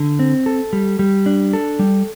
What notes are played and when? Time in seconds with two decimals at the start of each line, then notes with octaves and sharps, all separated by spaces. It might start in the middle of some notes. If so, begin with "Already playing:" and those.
Already playing: D3
0.19 C4
0.46 A4
0.73 G3
0.99 G3
1.26 D4
1.53 A4
1.79 G3